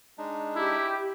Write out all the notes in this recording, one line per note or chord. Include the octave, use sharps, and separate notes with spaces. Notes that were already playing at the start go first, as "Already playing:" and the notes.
G#3 D4 D#4
E4 G4